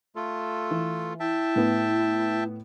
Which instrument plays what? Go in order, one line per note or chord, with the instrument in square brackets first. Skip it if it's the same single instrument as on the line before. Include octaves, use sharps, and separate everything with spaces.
[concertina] A3 F4 A4
[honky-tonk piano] E3
[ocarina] E4 [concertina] E5 G5 A5
[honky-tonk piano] A2 B3